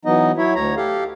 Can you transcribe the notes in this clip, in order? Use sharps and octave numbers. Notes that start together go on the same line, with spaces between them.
E3 F#3 B3 D#4 D#5
F#3 E4 C#5 E5
D2 C#5 A#5
G4 A4 F5